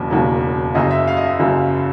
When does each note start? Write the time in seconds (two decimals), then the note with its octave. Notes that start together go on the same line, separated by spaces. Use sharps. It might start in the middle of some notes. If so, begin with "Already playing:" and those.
Already playing: E1 D#2 C#3 F#3
0.10 E1 D#2 C#3 F#3
0.75 F#1 F#2 C#3 D#5
0.91 E5
1.08 F5
1.17 D#5
1.24 E5
1.39 F#1 F#2 C#3